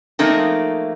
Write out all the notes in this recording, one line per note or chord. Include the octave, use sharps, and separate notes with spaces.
F3 F#3 A3 A#3 C4 D#4